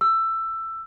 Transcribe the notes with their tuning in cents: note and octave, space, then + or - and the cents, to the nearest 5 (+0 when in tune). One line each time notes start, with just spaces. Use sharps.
E6 +15